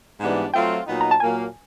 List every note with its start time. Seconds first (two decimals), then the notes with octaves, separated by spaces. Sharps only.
0.20 G#2 E3 G3 B3 D4
0.53 F#3 A3 C4 F4 G5
0.87 A#2 F#3 B3 D#4
1.01 A#5
1.11 A5
1.20 A#2 F#3 A#3 G#5